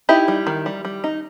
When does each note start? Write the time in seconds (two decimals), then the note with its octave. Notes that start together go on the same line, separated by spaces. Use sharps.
0.09 D#4 E4 G4
0.28 G3
0.47 D#3
0.66 G3
0.85 G3
1.04 D#4